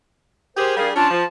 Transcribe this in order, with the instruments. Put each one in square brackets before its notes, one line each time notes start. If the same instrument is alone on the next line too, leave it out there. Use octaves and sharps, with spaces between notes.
[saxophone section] G4 G#4 [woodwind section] A#4 C5
[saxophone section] G3 D4 G#4 [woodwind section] A#4 D5 F5
[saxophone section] C#4 D4 [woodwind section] F4 A5
[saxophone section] F3